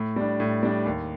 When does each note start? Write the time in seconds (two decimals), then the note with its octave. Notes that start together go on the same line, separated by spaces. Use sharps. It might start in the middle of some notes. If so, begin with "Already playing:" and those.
Already playing: A2
0.16 G3 D4
0.40 A2
0.63 G3 D4
0.86 D#2